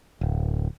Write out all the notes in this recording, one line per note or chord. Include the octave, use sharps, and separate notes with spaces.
D1